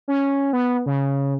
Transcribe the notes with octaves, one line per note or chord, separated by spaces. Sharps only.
C#4
B3
C#3